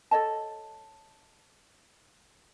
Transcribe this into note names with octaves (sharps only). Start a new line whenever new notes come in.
A4 C#5 D#5 A5